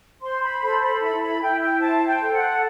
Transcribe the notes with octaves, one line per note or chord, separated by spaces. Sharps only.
C5 C6
B5
A4 B5
B5
E4 B5
B5
E4 G5
G5
C5 A5
G5
A4
F#5